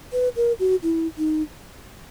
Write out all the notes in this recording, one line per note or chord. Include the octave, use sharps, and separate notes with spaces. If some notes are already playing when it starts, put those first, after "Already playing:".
B4
A#4
F#4
E4
D#4